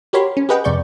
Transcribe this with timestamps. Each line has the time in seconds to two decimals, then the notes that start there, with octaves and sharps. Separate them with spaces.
0.13 F#4 G4 A#4 C#5 B5 C6
0.37 C#4
0.49 G4 G#4 B4 D#5 F#5 G5
0.64 F2 C3 D5 C#6 G6